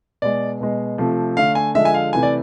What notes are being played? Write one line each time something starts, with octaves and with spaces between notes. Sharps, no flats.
B2 G#3 D5
B2 G#3
C3 F3 A3
D3 A3 F5
G#5
D3 F3 G#3 E5
G#5
F5
C3 E3 A3 G#5
D5